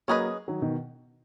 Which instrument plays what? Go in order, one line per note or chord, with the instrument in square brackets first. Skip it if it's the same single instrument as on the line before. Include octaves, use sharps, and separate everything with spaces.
[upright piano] F#3 A#3 [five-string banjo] C#4 G#4 B4 D#5
[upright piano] D#3 F#3
B2 D#3